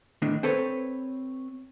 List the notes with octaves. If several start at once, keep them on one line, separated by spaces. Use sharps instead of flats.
A2 D#3 D4
C4 A4 B4 C#5